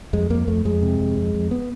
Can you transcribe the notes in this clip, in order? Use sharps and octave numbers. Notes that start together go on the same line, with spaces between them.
F2 G#3
F2 A#3
F2 A3
F2 G#3
C3
F2
F2
F2
B3